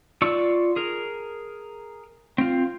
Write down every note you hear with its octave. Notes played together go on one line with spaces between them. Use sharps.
F4 D5 C#6 E6
G#4 A#4
C4 F4